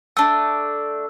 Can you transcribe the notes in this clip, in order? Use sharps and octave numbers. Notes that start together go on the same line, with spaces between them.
A3 D4 E6